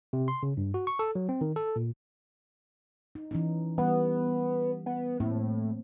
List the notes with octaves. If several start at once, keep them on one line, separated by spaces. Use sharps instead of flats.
C3
C6
C#3
G2
F#4
C#6
A4
F#3
C4
D#3
A4
A#2
D#4
E3 C#4 D#4
E3 G3 B3
B3
A2 A3 A#3 C4